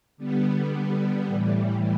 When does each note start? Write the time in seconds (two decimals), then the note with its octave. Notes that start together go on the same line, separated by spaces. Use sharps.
0.17 D3 G3 B3
1.26 A2 E3 G3